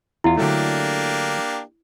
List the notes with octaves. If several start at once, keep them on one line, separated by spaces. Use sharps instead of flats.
E2 E4 F4
D3 F#3 A3 A#3 D4 G4